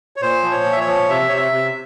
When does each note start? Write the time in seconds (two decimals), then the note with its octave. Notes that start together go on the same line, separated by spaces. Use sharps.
0.16 C#5
0.22 A#2 C5
0.43 F3
0.51 C#5
0.65 A#2
0.72 E5
0.80 C#5
0.87 F3
1.09 C3 E5
1.28 C3 C#5
1.37 E5
1.52 C3